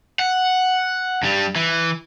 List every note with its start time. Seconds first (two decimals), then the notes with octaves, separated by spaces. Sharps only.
0.19 F#5
1.23 G2 G3
1.56 E3